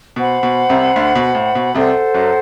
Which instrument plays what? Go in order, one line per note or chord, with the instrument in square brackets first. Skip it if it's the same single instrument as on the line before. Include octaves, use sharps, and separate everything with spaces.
[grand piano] B2 [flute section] C5 F#5 B5
[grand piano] B2
C2 C3
D2 D3
B2
A2
B2
[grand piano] C2 C3 [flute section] A4 C5 F#5
[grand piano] F#2 F#3